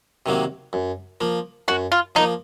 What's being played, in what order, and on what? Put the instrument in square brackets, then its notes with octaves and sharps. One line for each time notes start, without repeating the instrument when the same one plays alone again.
[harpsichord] C3 D#3 F#3 A#3
F#2
F3 A#3
[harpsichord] F#2 [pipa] F#4
[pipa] F4
[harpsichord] F3 A#3 [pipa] D#4